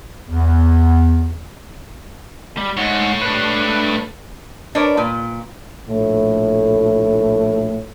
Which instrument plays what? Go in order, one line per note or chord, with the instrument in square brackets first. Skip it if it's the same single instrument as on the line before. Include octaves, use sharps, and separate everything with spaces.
[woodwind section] E2
[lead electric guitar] G3
[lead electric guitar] G#2 [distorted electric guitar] A3 C#5
[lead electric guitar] D4 B4
[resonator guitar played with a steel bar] D4 A#4 B4 C#5 D5
A#2
[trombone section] A#1 A2